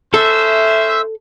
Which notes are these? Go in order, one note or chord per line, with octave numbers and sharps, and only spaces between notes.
C#4 A4 C5 E5